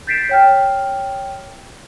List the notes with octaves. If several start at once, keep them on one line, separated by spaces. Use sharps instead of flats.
G6 A6 B6 C7 D7 E7
C#5 G5 F6